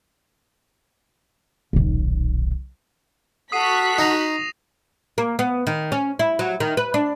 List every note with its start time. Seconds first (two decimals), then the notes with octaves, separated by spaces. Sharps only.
1.73 D#1 B1
3.52 F#4 A4 F#5 D#6 F#6 B6 C7 D#7
3.98 D#4 D#6 A#6 F7
5.18 A#3
5.39 B3
5.67 D#3
5.92 C#4
6.19 E4
6.39 F#3
6.60 D#3
6.77 B4
6.94 D4